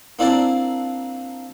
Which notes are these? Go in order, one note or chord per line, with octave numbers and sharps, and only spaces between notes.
A#3 C4 D4 E4 A#4 A5